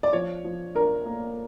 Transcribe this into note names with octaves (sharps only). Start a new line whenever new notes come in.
D5
F3 C#5
F3
D4 A#4
A#3